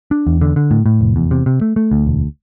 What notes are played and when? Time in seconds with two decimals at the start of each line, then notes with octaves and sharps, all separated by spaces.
0.11 D4
0.27 E2
0.41 D3
0.56 D3
0.71 A2
0.86 A2
1.01 F1
1.16 E2
1.31 C3
1.46 C3
1.61 A3
1.76 A3
1.91 D2
2.07 E1